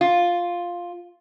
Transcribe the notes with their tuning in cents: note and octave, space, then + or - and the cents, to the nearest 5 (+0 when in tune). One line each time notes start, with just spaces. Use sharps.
F4 +5